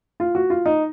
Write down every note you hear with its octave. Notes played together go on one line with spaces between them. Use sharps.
F4
F#4
F4
D#4